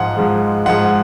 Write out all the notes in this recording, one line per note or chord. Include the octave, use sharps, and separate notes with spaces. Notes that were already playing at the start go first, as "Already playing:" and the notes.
Already playing: G#2 F3 G#3 F#5
G#2 F3 G#3
G#2 F3 G#3 F#5